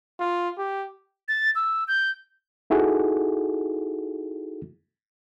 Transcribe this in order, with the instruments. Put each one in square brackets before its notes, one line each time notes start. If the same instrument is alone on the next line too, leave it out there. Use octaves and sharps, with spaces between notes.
[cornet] F4
G4
[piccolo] A6
E6
G6
[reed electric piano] D#4 E4 F#4 G#4 A4